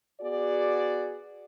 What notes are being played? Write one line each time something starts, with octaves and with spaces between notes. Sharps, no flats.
B3 F#4 G#4 D5